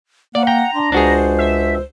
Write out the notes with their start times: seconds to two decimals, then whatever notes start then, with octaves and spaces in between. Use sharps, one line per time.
0.35 A#3 D5 F#5
0.47 G5 A#5
0.74 D4 C6
0.92 C#2 D4 F#4 G#4 C5
1.39 E5